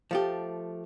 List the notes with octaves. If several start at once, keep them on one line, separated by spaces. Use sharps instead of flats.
F3 A3 G4